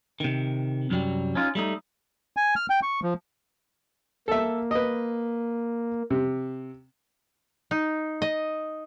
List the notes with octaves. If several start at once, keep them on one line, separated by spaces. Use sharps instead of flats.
C3 D#3
C2 F#2 F#3 G3
C#4 D#4 F4
G3 A3 D#4
G#5
F6
G5
C#6
F3
A#3 A4 E5
B4 D#5
C3
D#4
D#5